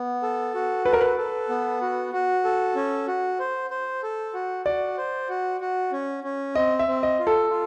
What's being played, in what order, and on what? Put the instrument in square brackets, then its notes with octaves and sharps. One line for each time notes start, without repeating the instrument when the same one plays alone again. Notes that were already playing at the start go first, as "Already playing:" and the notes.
Already playing: [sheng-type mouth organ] B3
A4
F#4
[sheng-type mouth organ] A4 [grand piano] B4
[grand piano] A#4
B4
[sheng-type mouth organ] A4
B3
F#4
F#4
A4
C#4
F#4
C5
C5
A4
F#4
[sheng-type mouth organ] F#4 [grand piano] D5
[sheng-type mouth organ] C5
F#4
F#4
C#4
C#4
[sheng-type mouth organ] C4 [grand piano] D#5
[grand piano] E5
[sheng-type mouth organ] C4
[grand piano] D#5
[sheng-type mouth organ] F4
[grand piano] A4
[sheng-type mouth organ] F4